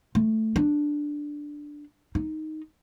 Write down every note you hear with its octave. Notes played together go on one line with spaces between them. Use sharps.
A3
D4
D#4